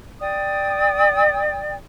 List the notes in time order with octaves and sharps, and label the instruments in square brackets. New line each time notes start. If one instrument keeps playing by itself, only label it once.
[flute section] D5 G5 D#6